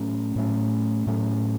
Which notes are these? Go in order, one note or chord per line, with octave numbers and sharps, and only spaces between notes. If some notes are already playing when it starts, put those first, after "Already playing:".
Already playing: A2 F#3 A3 C#4
A2 F#3 A3 C#4
A2 F#3 A3 C#4